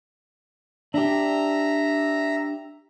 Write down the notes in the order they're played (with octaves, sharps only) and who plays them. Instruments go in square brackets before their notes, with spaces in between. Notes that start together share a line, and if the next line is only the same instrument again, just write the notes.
[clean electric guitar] D4 G4 [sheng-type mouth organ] E5 A#5